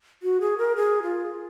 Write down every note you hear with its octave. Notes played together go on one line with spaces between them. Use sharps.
F#4
G#4
A#4
G#4
F4